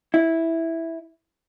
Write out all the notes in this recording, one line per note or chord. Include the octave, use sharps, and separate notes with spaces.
E4